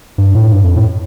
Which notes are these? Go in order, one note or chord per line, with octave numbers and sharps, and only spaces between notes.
G2
A2
G2
F2
A2